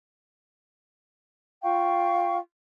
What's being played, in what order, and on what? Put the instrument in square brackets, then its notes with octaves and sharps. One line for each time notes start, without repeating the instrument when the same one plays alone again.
[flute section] F4 F5 G5 C#6